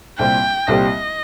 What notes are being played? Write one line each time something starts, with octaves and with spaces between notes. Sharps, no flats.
C2 A#2 G3 C4 G4 G5
C2 A#2 G3 C4 G4 D#5